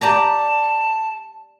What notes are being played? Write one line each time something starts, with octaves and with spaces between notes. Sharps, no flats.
G4 D5 A5 A#5